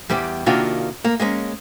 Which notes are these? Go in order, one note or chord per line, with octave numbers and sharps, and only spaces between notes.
E2 G3 G4
C3 D#3 A#3 D4 F4 F#4
A#3
G#3 A#3 C#4